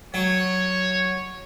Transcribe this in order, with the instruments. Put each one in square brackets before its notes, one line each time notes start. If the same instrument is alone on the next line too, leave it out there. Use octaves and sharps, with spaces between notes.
[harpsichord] F#3 [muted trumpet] C#5